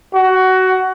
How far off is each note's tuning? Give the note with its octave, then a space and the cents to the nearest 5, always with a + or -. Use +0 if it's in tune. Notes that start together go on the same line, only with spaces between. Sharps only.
F#4 +15